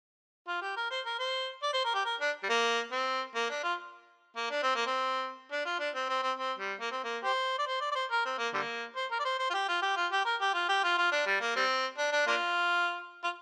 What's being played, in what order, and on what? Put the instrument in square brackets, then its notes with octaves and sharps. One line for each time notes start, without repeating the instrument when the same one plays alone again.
[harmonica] F4
G4
A#4
C5
A#4
C5
D5
C5
A#4
G4
A#4
D4
G3
A#3
C4
A#3
D4
F4
A#3
D4
C4
A#3
C4
D4
F4
D4
C4
C4
C4
C4
G3
A#3
C4
A#3
G4 C5
D5
C5
D5
D5
C5
A#4
C4
A#3
D3 G3 A#3
C5
A#4
D5
C5
C5
F4
G4
F4
G4
F4
G4
A#4
G4
F4
G4
F4
F4
D4
G3
A#3
G3 C4
D4
D4
A#3 D4 F4
F4